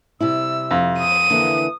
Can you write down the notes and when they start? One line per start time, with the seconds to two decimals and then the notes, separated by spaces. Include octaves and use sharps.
0.21 C3 G3 E4 E6
0.71 F2
0.99 D#6 D#7
1.30 D3 E3 A#3